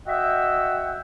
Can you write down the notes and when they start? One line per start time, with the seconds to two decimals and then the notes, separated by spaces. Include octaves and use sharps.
0.07 F#4 D#5 E5 F#5 G5 E6